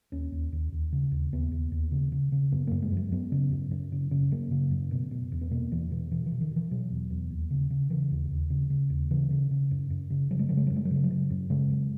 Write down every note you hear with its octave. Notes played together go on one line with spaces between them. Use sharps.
D#2 C#4
D#2
D#2
D#2
C#3
D#2
D#2 B3
D#2
D#2
C#3
C#3
C#3
F#2 B3
F#2 A#3
G#3
F#2
F#3
F#2 B3
C#3
F#2
F#2
C#3
C#3
F#2 A#3
C#3
F#2
B2
B2
E2
B3
B2 A#3
E2 E3
B2 E3
B2 E3
E3
B2
D#3
B2 E3
B2 F#3
E2
E2
D#2
C#3
C#3
C#3 E3
D#2
D#2
C#3
C#3
D#2
C#3 E3
C#3
C#3
F#2
F#2
C#3
C#3 F#3
G#3
C#3 F#3
G#3
F#2 F#3
G#3
F#3
C#3 G#3
F#3
C#3
F#2
C#3 G#3
F#2